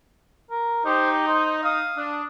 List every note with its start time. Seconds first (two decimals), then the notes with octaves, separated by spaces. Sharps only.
0.50 A#4
0.86 D#4 G4 C5
1.27 C5 D#5
1.64 F5 D#6
1.96 D4